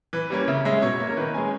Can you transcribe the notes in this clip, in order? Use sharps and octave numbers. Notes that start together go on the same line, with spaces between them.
E3 B4
G3 A#3 C#4
C#3 E5
G#3 C#4 E5
B2 C#5
A#3 C#4
A#4
D#3 B4
G#3 C#4 G#5